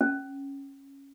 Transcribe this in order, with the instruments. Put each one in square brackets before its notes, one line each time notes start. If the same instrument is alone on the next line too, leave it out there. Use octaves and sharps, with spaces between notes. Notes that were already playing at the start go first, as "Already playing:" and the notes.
[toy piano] C#4